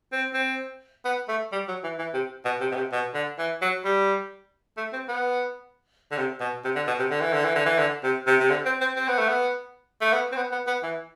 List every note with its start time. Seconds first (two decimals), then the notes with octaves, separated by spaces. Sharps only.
0.13 C4
0.34 C4
1.05 B3
1.29 A3
1.52 G3
1.68 F#3
1.84 E3
1.99 E3
2.14 C3
2.45 B2
2.61 C3
2.72 B2
2.76 C3
2.92 B2
3.15 D3
3.39 E3
3.62 F#3
3.85 G3
4.77 A3
4.93 C4
5.08 B3
6.12 D3
6.18 C3
6.41 B2
6.65 C3
6.76 D3
6.87 B2
6.99 C3
7.11 D3
7.21 E3
7.33 D3
7.45 E3
7.56 D3
7.66 E3
7.78 D3
8.04 C3
8.27 C3
8.40 C3
8.50 D3
8.66 C4
8.81 C4
8.97 C4
9.08 B3
9.19 A3
9.29 B3
10.02 A3
10.13 B3
10.32 C4
10.36 B3
10.52 B3
10.67 B3
10.83 E3